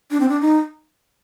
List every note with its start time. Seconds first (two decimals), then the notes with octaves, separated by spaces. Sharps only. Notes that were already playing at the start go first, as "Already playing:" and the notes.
0.11 D4
0.20 C4
0.29 D4
0.41 D#4